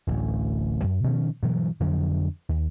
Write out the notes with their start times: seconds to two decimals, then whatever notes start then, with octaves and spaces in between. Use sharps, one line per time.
0.07 D1 A1 D2
0.84 F#2
1.04 B2 D#3 F3 C#4
1.43 G2 B2 E3 F#3
1.80 F2 D3 F3 F#3
2.49 D#2